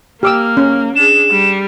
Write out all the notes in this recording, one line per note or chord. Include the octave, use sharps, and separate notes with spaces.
A#3 G4 D6 E6 F6
C#4
D4 G#4 E7
G3